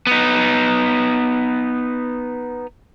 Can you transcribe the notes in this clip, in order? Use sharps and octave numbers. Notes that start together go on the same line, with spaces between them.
B3 D#4